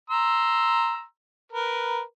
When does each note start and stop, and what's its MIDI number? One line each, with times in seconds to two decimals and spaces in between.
0.10 1.03 82
0.10 1.03 84
0.10 1.03 88
1.52 2.01 70
1.52 2.01 71